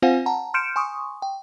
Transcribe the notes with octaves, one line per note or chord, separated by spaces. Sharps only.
C4 F4 C5 F5 F#5 G#5
F#5 A5 A#5
C6 F6 G6 C#7 D7 E7
G#5 C6 C#6 D#6
G5